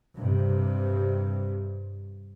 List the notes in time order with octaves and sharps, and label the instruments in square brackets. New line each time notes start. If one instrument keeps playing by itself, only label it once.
[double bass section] G2 C3